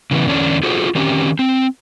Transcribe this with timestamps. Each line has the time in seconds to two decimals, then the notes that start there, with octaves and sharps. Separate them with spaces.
0.11 C#3 E3 B3
0.26 E2 D3 C#4 D4
0.63 F4 F#4 G#4 A4 C5
0.95 D#3 C4 C#4 G4
1.39 C4